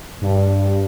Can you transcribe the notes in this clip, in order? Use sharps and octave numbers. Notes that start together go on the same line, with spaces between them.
G2